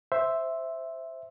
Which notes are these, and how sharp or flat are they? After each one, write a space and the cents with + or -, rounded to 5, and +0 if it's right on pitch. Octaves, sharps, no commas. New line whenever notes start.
C5 +0 E5 +0